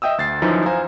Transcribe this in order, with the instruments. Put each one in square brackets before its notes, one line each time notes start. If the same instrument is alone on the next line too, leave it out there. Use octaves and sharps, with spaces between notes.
[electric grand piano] D#5 E5 G5 D#6 E6
D2 A6 C7
F#2 E3 F3 D#4
C5 F5 G#5 A#5